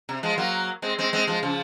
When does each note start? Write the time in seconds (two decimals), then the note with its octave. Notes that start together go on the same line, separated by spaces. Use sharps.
0.09 C3
0.23 F3 G#3
0.38 F#3 A#3
0.82 G#3 C4
0.98 G#3 C4
1.13 G#3 C4
1.27 F3 G#3
1.43 C#3 F3